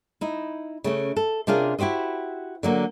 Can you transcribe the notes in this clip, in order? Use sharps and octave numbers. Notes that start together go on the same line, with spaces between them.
D#4 E4
C#3 A3 C#4
A4
C3 C#4 D4 F4 G#4 A#4
E4 F#4 G4 C5 D#5
D3 F#3 A#3